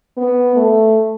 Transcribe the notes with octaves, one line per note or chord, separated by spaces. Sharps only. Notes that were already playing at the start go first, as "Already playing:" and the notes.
B3
A3